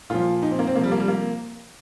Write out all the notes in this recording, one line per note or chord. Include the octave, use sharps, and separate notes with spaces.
A#2 F3 F4
D#4
C4
A#3
C4
C3 F3 A#3
G3
A#3
G3
A#3